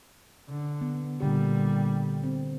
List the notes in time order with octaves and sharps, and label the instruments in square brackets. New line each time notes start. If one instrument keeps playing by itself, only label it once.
[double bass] D3
[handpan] B3
[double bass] A#2 G3 [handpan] D3 G4
[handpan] C4